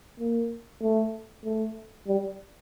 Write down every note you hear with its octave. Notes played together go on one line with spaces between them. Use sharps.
A#3
A3
A3
G3